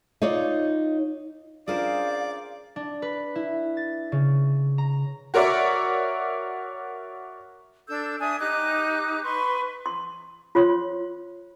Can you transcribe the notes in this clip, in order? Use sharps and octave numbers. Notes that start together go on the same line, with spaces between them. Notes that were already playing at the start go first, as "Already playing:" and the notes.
D#4 F4 C#5 D5
C#4 D4 F4 G#4 A#4 C5 D5 F5
D4
B4
E4
A6
C#3
A#5
F#4 A#4 C#5 D5 E5
D4 A4 E6 G6
D4 E5 G#5 D#6
D#4 G4 D6 F#6
B4 C6 C#6
C6
F4 C5 C#5 C6